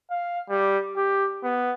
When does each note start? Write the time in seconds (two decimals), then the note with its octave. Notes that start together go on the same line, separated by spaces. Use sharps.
0.11 F5
0.50 G3
0.96 G4
1.44 B3